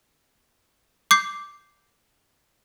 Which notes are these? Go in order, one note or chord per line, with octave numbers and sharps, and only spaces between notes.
D6 G6 C7